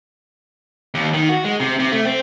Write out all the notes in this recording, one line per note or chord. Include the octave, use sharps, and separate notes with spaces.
D#2
D#3
F#4
G#3
C3
C3
A3
C4